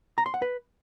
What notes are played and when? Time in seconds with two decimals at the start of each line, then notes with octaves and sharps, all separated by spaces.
0.18 A#5
0.26 C6
0.34 F#5
0.42 B4